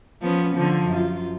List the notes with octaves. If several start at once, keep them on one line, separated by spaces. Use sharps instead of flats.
F3 B3 C#4
D3 F3
F#2 F4